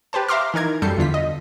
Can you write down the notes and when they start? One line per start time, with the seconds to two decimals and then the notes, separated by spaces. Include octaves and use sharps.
0.13 G4 B4 C5 A5
0.28 E5 F5 A#5 C6 D6 F6
0.54 E3 D#4 A#4 G#6
0.82 F#2 G3 A4 G6 C7 C#7
0.97 E2 D3 F4 B6
1.14 D#5